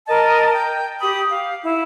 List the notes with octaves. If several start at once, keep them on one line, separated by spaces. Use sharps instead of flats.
A#4 D#5 A5
G5
G4 B5 D#6
F5
E4